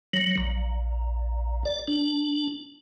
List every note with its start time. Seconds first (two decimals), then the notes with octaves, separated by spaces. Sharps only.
0.13 F#3
0.38 A#1
1.65 D5
1.88 D4